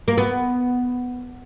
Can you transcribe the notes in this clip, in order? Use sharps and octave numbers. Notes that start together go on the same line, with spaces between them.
A#3
B3